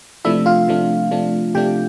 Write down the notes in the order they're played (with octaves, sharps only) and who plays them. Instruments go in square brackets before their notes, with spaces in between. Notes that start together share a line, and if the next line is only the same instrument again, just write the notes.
[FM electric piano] C3 F3 A3 D4 E4 E5
F4 F5
C3 F3 A3 D4
C3 F3 A3 D4
C3 F3 A3 D4 G4 G5